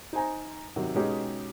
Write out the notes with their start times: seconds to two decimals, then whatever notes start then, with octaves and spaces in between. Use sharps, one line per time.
0.13 D#4 C5 G#5 A#5
0.76 C3 D#3 F#3
0.95 B2 G#3 C#4 D#4 G4